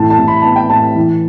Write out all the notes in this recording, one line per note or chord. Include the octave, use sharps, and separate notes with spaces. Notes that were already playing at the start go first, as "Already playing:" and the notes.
Already playing: A2 E3 A5
A5
A2
B5
B3 A5
G5
A2 A5
E3